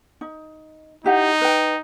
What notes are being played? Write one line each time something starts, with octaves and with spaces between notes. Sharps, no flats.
D#4
D#4 E4 G4 F#5
B4 G5